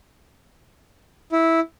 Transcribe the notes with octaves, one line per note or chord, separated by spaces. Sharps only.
E4